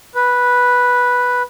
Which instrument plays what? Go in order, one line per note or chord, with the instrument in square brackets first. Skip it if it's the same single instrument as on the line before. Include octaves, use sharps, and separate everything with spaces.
[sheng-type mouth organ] B4